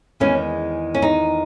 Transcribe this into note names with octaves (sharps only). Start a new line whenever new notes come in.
E2 D#3 G#3 C#4
C#4
D#4